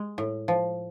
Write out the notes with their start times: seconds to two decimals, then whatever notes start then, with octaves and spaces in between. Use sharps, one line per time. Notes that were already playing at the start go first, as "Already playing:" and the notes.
Already playing: G#3
0.18 A2
0.48 F3